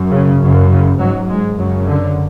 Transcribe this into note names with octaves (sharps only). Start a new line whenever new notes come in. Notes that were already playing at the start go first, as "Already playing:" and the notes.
Already playing: F#2
C#3
F#2 C#3
C#3
G#2 F#3
G#3
F#2 C#3 F#3
D3